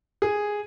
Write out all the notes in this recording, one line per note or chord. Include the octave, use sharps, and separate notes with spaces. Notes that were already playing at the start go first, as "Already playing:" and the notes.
G#4